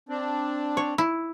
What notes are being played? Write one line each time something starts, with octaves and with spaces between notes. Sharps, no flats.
C4 D4
C#5
E4